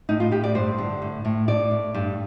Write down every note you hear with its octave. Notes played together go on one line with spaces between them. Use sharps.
A2 D#4
F4
A2 G4
D5
G2 C5
D3
A2
A2
A2 D5
A2
G2